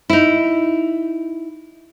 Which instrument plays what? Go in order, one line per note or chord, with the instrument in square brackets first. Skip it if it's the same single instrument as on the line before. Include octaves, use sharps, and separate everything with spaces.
[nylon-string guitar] D#4 E4